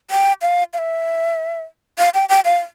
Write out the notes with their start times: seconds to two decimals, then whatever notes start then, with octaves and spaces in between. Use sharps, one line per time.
0.11 G5
0.42 F5
0.73 F5
0.78 E5
1.98 F5
2.14 G5
2.29 G5
2.45 F5